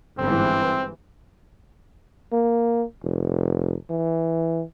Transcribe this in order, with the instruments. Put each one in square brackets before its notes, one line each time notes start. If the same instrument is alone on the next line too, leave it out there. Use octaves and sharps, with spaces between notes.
[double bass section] G1 G#2 E3 [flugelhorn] C4
[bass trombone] A#3
F1
E3